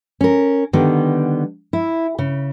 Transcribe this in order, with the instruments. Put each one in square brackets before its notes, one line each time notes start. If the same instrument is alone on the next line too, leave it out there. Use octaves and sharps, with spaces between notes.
[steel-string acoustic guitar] C#4 A#4
D3 D#3 G3 B3
E4
C#3